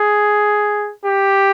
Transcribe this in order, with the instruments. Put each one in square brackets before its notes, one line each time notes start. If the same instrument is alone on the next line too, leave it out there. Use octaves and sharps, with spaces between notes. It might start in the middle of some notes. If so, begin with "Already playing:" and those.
Already playing: [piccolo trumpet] G#4
G4